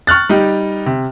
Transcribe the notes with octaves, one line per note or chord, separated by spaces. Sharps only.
C#6 F6 F#6 A6
G3 D#4 G4
C3